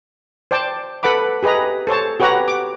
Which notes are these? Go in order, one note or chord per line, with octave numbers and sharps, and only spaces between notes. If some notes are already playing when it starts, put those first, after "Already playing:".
C5 D5 G5 A5
A4 B4 F#5 B5 D6
G4 G#4 B4 D#5 A#5
A4 C5 C#5 A5
F#4 G4 B4 C#5 F#5 A#5
D6